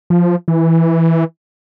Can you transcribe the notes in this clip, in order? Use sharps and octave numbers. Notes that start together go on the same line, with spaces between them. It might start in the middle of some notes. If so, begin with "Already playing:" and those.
F3
E3